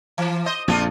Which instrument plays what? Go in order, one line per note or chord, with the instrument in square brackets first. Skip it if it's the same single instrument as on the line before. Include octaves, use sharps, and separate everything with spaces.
[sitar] E3
C5 D#5
[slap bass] A#1 F2 [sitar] C4 D4 F4